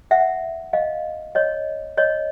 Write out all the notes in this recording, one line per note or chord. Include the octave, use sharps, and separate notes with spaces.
E5 F#5
D#5 F5
C#5 D#5
C#5 D#5